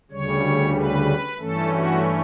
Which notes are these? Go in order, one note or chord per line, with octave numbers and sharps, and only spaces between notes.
D2 C#3 G3 C#5
B4
G2 E3 A3 C#4 A4
F#4